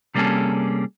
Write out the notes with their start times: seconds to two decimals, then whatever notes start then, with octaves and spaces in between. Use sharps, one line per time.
0.15 C3 G3 A#3 C#4 G#4 A4